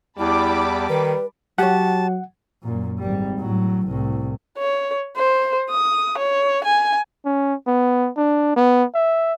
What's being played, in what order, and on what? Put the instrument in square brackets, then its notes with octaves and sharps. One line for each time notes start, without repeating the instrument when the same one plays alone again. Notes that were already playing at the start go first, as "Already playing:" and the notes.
[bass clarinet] E2 [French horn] G3 [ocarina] E4 [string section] A5 B5 D6
[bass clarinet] D#3 [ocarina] B4
[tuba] F#3 [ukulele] G4 C#5 [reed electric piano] F#5 [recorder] A5
[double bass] F#2 A#2
G#1 G3
A2 F#3
C2 A2
[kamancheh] C#5
C5
D#6
C#5
G#5
[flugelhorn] C#4
B3
D4
B3
E5